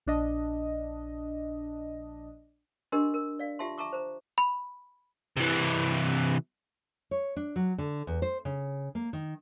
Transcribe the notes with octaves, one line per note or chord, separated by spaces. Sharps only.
A#1 D4 D#5
D4 G4 A#4 D#5 C6
A#4
D5 F5
F4 G4 E5 A5 C6
E5 A5 A#5 C#6 D6
C5 A#5
B5
C3 E3
C#5
D4
F#3
D3
E2
C5
C#3
A#3
D#3